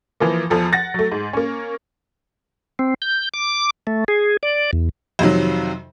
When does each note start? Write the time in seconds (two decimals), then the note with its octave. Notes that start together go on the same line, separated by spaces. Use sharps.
0.20 E3 F3 A#3
0.50 E2 F3 A4
0.72 F#5 A6 A#6
0.94 F#3 A3
1.12 G#2
1.33 A#3 C#4
2.79 C4
3.02 G6
3.34 D6
3.87 A3
4.08 G#4
4.43 D5
4.73 E2
5.19 F2 C3 D#3 F#3